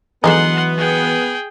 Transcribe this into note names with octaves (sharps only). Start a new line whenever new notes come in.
D3 E3 F#3 G#3 B3 D#4 F#5 C6
G#4 G5